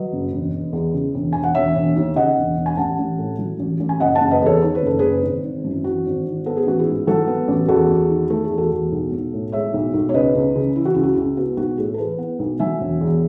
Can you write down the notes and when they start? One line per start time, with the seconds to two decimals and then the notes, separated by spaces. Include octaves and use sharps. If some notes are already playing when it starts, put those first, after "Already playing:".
Already playing: F#3 B4 D#5
0.12 F#1
0.32 E1
0.52 E1
0.73 E2
0.94 C#3
1.14 E1
1.33 E1 G#5
1.44 F#5
1.55 E1 C#5 E5
1.76 E1
1.96 D#2
2.16 C#3 D#5 F#5
2.37 E1
2.57 E1
2.66 G#5
2.77 A1 F#5 A5
2.99 A1
3.18 A2
3.39 F#3
3.59 A1
3.80 A1
3.89 G#5
4.00 F#1 D#5 F#5
4.15 F#1 F#5 A5
4.31 B4 D#5
4.42 E2 A4 C#5
4.62 D#3 C#5
4.75 B4
4.82 F#1 A4
4.99 F#1 G#4 B4
5.23 G#1
5.44 G#1
5.64 F#2
5.71 E4
5.84 E3 F#4
6.05 G#1
6.25 G#1
6.46 B3 A4
6.57 G#4
6.67 A1 F#4
6.79 E4 G#4
6.87 G#2
7.07 F#3 F#4 A4
7.27 B3
7.48 A1
7.68 E2 F#4 A4
7.89 E2
8.09 D#3
8.30 A3 A4
8.44 G#4
8.51 E2
8.58 F#4 A4
8.71 E2
8.92 B1
9.12 B1
9.33 A2
9.52 G#3 C#5 E5
9.74 B1
9.94 B1
10.09 C#5
10.14 C#2 B4 D#5
10.35 C#2
10.55 C#3
10.76 E3 E4
10.85 F#4
10.94 C#2 E4
11.03 F#4
11.14 C#2 E4
11.37 B3 F#4
11.57 B1 F#4
11.78 A2 E4 G#4
11.94 A4
11.98 E3 G#4 B4
12.19 B3
12.39 B1
12.60 F#3 E5 G#5
12.80 E1
13.01 E2